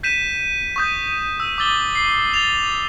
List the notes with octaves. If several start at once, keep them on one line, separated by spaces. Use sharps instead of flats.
G6 B6 D#7 E7
C#6 D#6 G6
E6
D6 E6 A6 G7
C7
A6 F7 G7